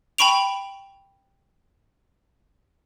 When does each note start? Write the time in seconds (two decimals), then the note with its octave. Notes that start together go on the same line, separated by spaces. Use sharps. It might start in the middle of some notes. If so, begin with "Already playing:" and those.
0.18 G5 A5 B5 C#6 D7 F7